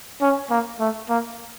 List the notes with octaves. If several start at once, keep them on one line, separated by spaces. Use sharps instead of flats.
C#4
A#3
A3
A#3